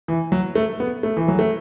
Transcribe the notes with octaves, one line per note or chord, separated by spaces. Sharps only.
E3
F#3
A3
B3
A3
E3
F#3
A3